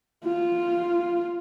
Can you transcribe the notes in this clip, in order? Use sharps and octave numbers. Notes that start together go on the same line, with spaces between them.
F4